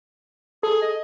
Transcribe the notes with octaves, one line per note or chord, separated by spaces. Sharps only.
G#4 A4
D#5